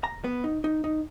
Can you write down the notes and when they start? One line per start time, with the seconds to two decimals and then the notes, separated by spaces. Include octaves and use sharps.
0.04 A#5
0.24 B3
0.44 D#4
0.64 D#4
0.84 D#4